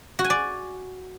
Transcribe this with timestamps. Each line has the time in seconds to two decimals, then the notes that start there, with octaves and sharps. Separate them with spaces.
0.19 F#4
0.24 G#5
0.30 D5